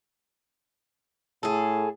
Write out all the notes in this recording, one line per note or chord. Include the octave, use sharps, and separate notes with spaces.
A2 G#4 A4